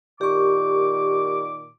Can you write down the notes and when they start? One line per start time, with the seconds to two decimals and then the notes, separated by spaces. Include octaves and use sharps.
0.21 A#2 D#3 G4 C#6 D6